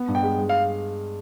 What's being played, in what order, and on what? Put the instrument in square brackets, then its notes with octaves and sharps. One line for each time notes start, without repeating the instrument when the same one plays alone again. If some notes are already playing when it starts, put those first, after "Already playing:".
Already playing: [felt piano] B3
G2
[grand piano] G5
[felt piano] G#3
G#3
[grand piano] F5